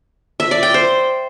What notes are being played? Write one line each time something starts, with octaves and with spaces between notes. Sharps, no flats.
E5
D5
G5
C5